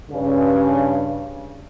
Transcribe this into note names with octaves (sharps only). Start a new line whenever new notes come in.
G2 C#3